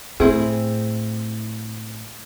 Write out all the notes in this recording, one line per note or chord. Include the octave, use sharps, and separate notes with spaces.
A2 C4 E4 G#4